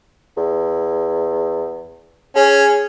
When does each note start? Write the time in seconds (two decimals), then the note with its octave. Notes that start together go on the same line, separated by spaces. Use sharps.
0.37 E2
2.36 C#4 G#4